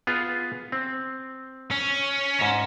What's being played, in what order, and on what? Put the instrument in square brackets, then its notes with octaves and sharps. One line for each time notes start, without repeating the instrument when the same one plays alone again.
[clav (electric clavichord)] B3 F4 G#4
C4
[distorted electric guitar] C#4
[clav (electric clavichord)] G#2 E5 A#5